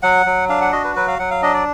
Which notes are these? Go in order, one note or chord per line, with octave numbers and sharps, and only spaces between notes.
F#3 F#5
F#3
D4 F5
F#5
F#4 D#5
B4
F#3 B4
F5
F#3 F#5
F5
D4 D#5
D5